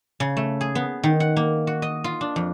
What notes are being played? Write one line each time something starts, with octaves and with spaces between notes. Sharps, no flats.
C#3
A3
G#4
B3
D#3
F#5
A#3
F#4
D#5
F4
D4
F2